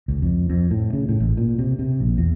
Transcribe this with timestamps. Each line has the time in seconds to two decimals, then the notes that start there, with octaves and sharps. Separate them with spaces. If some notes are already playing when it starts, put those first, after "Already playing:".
0.08 C#2
0.22 F2
0.49 F2
0.71 A2
0.93 C#3
1.09 A2
1.20 A1
1.37 A#2
1.59 C3
1.79 C3
2.00 A#1
2.18 E2